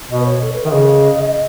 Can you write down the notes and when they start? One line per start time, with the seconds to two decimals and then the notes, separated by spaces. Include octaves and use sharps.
0.10 B2 D#5
0.20 B4
0.26 C#5
0.42 A4
0.52 C#5
0.56 B4
0.65 D#3 E5
0.71 C#3 D#5